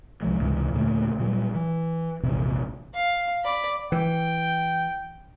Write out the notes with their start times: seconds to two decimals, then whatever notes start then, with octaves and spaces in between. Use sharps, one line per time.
0.22 C2 F3 G#3
0.40 C#2 G#2 C3 E3
0.73 D#2 A#2 D3 A3
1.19 A#2 F#3 G3
1.55 E3
2.23 A#1 E2 G#2 C3
2.94 F5
3.44 D5 B5
3.92 E3 G5